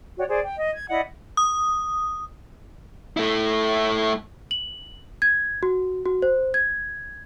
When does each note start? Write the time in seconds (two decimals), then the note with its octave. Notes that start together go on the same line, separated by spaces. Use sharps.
0.17 F#4 C#5 D5 G5
0.29 G#4 C5 D5
0.44 G5
0.57 D#5
0.73 G#6
0.89 E4 D5 D#5 F#5
1.37 D#6
3.17 A3 E4
4.51 F#7
5.22 G#6
5.63 F#4
6.06 F#4
6.22 C5
6.54 G#6